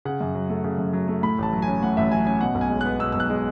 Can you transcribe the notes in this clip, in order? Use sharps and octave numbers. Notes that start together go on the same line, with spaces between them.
C#3 F#5
F#2
F#3
A3
C#3
F#2
F#3
A3
A2 B5
A1 A5
F#3
G#5
C#4
A2 F#5
A1 E5
F#3 G#5
C#4 G#5
B2 F#5
B1
G#5
G#3
B3 F#6
B2 E6
B1 E6
F#6
G#3